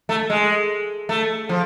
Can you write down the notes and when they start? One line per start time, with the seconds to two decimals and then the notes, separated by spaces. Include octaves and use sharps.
0.09 A3
0.30 G#3
1.09 A3
1.49 F3